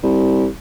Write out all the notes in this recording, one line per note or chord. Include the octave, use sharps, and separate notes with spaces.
C2